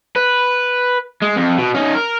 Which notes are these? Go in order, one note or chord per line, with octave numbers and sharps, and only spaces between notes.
B4
G#3
F2
B2
C#4 D#4
A#4